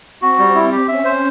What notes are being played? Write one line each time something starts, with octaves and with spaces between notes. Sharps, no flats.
C4 F#4
G3
E4
G4
C#4 E5
C5